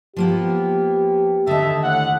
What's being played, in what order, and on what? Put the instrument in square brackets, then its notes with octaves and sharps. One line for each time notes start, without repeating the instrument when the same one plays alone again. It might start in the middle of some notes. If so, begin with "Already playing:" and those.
[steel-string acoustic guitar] F3 A#3 B3 [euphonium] G4
[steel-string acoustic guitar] D#2 D3 [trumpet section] D#5 E5 A5
[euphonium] A2 [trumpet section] F#5